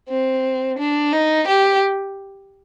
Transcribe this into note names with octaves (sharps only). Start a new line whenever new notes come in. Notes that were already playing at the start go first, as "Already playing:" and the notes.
C4
D4
D#4
G4